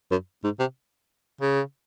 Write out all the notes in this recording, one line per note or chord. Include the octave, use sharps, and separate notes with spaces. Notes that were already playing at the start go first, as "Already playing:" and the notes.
F#2
G#2
C3
C#3